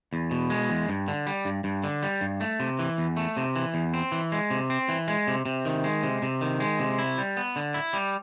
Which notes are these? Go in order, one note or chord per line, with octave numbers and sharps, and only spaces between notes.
E2
B2
G#3
E2
G2
D3
G3
G2
G2
D3
G3
G2
A3
C3
E3
E2
A3
C3
E3
E2
C4
E3
G#3
C3
C4
E3
G#3
C3
C3
D#3
G#3
C3
C3
D#3
G#3
C3
E4
G3
B3
D3
E4
G3